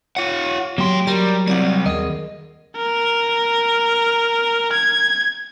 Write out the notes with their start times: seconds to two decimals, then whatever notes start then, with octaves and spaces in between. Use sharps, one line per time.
0.17 F4 C#5 F#5
0.78 F#3 A#3 G4 C6
1.07 F#3 G3 A#4 D5 A#5
1.48 G3 C4 D5 F#5
1.86 D#2 G#4 A#4 D#5
2.77 A#4
4.72 G#6